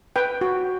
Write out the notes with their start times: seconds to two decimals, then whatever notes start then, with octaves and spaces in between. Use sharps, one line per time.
0.16 B4 G5
0.41 F#4